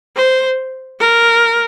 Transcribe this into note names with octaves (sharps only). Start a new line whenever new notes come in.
C5
A#4